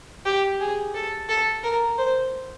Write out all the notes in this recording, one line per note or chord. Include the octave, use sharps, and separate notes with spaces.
G4
G#4
A4
A4
A#4
C5